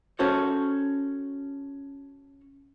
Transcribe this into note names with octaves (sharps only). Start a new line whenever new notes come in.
C#4 F#4 A4 C5 C#5